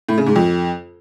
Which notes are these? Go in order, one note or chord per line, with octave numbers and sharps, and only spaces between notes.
A2
C#3
G#2
F2